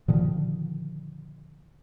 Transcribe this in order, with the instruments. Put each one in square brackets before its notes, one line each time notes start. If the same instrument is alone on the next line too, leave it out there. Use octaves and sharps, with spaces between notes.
[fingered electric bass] A#2 D3 D#3 F3